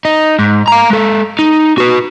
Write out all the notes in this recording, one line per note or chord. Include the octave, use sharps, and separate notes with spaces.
D#4
G#2
F5 A#5
G#3 A4
D#4
F#4 B4